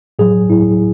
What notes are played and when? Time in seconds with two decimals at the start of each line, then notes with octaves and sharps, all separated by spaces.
0.19 A2 F#3 G#4
0.49 A2 F#3 E4